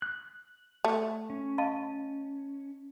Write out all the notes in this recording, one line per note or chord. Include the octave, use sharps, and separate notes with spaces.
F#6
A3
C#4
D#5 F5 A5